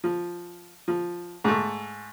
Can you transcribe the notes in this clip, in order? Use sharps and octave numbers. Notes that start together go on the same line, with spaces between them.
F3
F3
G#2 A3